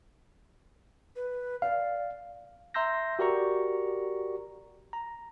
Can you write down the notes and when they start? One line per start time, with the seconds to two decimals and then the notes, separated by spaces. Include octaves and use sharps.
1.16 B4
1.62 D5 F5
2.74 E5 A#5 C6 E6 G6 A#6
3.19 F#4 G4 A#4 D5 A#5 C#6
4.93 A#5